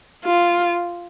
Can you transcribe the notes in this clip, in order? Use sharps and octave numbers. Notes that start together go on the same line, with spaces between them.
F4